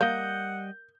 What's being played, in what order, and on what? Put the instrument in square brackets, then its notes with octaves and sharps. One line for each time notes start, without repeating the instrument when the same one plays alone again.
[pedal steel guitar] G3 D#5 [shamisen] A#3 [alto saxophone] F#5 [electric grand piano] G6